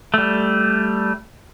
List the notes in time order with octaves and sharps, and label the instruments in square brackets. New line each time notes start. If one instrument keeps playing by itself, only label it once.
[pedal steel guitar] G3 A3